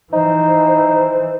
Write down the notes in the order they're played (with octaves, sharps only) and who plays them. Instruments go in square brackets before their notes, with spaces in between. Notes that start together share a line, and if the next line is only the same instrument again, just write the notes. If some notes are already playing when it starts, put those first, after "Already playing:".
[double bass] E3 [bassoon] D#4 [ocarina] C5